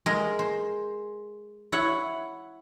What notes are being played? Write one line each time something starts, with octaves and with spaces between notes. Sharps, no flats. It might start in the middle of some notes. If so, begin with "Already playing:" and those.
G#3 G#4 A#4
C5
E4 C#5 F#5